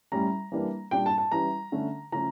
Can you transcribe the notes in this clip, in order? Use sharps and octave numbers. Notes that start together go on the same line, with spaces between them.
A2 G3 C#4 A#5
E3 G3 A#3 D4
A#2 G3 D4 G5
A5
A5
E3 G3 C#4 A#5
D3 A3 C#4
C#3 F3 A3 C#4 A#5